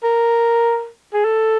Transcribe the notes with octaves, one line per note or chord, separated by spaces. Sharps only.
A#4
G#4
A4